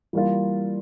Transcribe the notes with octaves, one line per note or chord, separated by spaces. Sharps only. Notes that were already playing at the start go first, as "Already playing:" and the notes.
E3 G3 A#3 F4